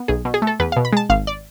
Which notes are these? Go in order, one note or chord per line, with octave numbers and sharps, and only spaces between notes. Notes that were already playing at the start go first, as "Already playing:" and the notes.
Already playing: B3
B1 G#4
B2
G#4
A3
A4
E2 B4
F5
B2
B5
G#3 A5
G#1 F5
D5